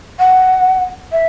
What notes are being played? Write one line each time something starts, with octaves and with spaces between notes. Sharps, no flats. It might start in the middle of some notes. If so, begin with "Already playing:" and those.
F#5
E5